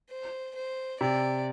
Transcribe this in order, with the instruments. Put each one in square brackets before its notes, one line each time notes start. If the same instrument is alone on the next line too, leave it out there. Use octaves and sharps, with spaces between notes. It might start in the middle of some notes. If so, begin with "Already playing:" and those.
[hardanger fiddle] C5
C5
[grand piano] C3 [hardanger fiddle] D5